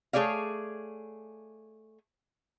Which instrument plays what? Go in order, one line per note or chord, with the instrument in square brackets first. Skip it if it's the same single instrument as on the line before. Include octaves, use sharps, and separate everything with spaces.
[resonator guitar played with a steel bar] A3 G#4 C#5 D5 F5